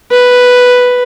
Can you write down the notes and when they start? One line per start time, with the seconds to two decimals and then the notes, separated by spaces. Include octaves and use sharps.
0.11 B4